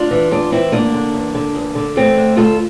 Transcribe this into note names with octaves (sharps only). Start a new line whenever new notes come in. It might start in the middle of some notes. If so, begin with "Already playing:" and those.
Already playing: D4 F4
E3
E2 D4 F4
E3 C4 E4
E2 A#3 D4
D3
E2
D3
E2
D3
E2 A3 C4
D3
D2 F4 A4